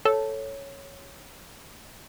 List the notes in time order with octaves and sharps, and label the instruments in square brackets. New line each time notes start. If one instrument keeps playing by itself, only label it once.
[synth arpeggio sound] A4 [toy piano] C#5